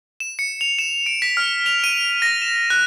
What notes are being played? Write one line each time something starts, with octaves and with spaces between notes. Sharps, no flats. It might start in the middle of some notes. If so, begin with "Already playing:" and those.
E7
C#7
F7
E7
D7
B6
F6
F7
D#7
A#6
E7
F#6